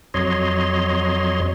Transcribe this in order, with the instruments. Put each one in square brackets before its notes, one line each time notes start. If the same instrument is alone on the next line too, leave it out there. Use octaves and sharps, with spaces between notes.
[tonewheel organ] F2 F#3 C#5 D#5 C6